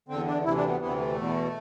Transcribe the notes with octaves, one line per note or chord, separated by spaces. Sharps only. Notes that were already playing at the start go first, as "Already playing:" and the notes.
E2 D3 C4
D4
D2 C3 E3 E4
D4
B3
D2 C3 E3 B3
A3
E2 B2